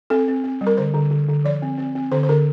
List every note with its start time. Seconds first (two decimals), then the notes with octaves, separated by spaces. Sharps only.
0.10 C4 A4
0.28 C4
0.44 C4
0.61 G3
0.67 A#4
0.77 D3 C5
0.94 D3
1.11 D3
1.28 D3
1.44 F3 D5
1.62 C4
1.78 C4
1.95 C4
2.12 D3 C5
2.23 C5
2.29 D3 A#4